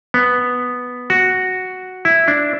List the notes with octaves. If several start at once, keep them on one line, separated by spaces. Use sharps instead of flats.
B3
F#4
E4
D4